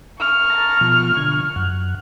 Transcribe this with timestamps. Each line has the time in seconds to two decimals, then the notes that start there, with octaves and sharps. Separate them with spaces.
0.19 C#6 F6
0.50 A5 A#5
0.81 B2 F3
1.17 D3 G#6
1.56 F#2 F#5